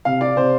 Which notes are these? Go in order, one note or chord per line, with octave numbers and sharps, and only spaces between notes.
C3 F5
D5
C3 C5